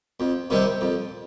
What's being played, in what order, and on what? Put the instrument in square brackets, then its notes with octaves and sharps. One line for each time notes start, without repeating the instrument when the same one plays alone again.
[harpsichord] F2
C3 D#3 G3 C4
F2